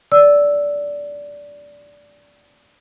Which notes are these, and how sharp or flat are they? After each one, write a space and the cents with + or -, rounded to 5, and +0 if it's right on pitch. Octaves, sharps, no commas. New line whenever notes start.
D5 -15 E6 +0